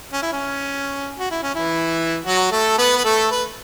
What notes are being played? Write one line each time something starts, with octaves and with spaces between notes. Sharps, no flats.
C#4
E4
C#4
F#4
E4
C#4
E3 E4
F#3 F#4
A3 A4
B3 B4
B4
A3 A4
B4